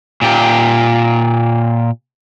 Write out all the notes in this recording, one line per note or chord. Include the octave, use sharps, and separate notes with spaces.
A#2 G4